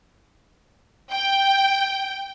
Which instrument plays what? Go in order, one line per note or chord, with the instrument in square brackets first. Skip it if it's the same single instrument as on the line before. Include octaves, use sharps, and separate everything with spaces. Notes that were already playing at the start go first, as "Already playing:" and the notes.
[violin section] G5